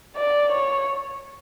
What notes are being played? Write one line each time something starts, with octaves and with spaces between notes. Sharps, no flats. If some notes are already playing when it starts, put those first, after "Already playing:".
D5
C#5